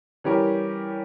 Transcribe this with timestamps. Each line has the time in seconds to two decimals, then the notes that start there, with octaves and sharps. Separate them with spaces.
0.24 E3 G3 C#4 G4 A#4